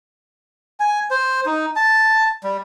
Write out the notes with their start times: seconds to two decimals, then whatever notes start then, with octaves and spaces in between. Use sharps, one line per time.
0.80 G#5
1.11 C5
1.46 D#4
1.76 A5
2.44 G3